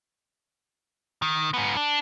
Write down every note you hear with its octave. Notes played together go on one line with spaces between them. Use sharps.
D#3
G#2 B3
D4